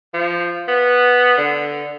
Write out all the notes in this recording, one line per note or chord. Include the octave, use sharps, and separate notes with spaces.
F3
B3
D3